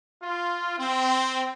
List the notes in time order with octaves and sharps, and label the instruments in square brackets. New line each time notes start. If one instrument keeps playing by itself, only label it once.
[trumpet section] F4
C4